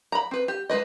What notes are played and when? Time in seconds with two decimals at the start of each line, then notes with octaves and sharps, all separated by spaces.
0.12 A#5 B5
0.31 C4 B4
0.48 G4
0.70 G#3 C4 B4 D#5